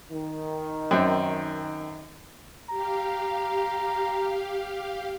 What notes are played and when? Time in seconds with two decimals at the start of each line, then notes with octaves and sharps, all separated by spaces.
0.11 D#3
0.91 F#2 C4
2.69 G4 F5 A#5